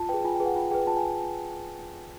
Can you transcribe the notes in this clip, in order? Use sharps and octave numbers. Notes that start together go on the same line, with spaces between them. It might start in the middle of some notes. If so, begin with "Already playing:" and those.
Already playing: F4 A5
G#4 B4 G5
F4 G#5
G5
G#4 B4
F#5
F4 G5
G#4 B4 G5
F4 A5
G#5